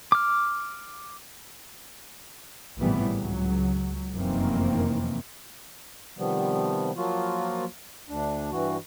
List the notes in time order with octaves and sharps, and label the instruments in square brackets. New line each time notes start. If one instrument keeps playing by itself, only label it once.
[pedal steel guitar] D6 F6
[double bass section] G#1 A2 C3 E3 G3 B3
C#2 F#3
F1 F#2 D#3 E3 A#3 C4
[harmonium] C3 D#3 F3 G3 B3
F3 F#3 A#3 F4 F#4
D2 D4
G2 E3 F#4